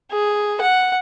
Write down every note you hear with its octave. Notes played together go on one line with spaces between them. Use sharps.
G#4
F#5